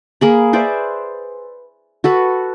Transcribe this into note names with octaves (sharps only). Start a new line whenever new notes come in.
A#3 G#4 B5
B4 C5 D5 E5
F#4 A4 B4